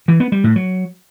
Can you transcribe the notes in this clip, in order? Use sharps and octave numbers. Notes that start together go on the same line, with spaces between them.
E3
B3
G3
A2
F#3